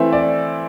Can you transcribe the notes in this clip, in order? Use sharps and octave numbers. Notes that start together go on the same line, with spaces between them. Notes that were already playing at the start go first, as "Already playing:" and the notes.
Already playing: E3 A3 C4 E5
D5